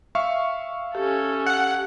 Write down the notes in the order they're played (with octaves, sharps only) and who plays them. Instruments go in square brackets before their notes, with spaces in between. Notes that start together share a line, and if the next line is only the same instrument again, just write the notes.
[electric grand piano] E5 F5 C#6
[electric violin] C#4 A4 [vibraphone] G4
[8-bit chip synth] F#5